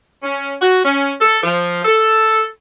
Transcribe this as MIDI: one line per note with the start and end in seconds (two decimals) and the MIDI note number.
0.23 0.53 61
0.61 0.78 66
0.84 1.12 61
1.20 1.40 69
1.43 1.81 53
1.85 2.46 69